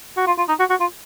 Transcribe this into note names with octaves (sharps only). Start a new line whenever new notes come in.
F#4
F4
F4
D#4
F#4
F#4
F4